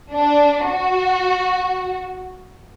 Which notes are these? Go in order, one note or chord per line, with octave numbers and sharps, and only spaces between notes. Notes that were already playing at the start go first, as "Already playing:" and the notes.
D4
F#4